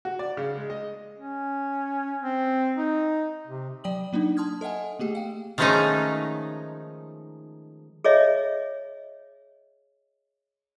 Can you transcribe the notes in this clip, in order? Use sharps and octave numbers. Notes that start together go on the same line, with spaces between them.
F#4
D5
C#3
G#3
D#5
C#4
C4
D#4
C3
F#3 D5 G5 D#6 F#7
F#3 A#3 D4 D#4
A5 C6 D#6 F6 G#6
A4 D#5 E5 F#5 G#5
A3 A#3 G4 G#4
F5 G5
D#3 F3 G#3 A3 C#4 D#4
G#4 C#5 D#5 E5